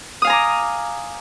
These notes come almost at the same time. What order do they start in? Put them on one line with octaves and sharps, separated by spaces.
D#6 F5 G#5 A#5 D6